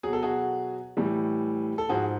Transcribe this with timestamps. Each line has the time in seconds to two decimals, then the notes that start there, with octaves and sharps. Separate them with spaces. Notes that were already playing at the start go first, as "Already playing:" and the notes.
0.03 B2 F#3 G#4
0.13 A4
0.23 F#4 G#4
0.97 A2 E3 G3
1.78 A4
1.89 G#2 F3 F#4 G#4